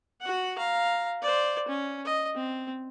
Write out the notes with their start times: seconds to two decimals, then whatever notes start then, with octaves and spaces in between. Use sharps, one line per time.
0.21 F#4 F#5
0.58 F5 A#5
1.22 C5 D5
1.68 C#4
2.05 D#5
2.35 C4